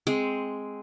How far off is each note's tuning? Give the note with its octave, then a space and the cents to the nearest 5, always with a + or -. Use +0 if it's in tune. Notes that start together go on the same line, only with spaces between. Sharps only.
G#3 +0 C4 +0